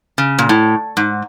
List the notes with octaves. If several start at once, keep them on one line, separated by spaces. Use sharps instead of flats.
C#3
A#2
A2
G#2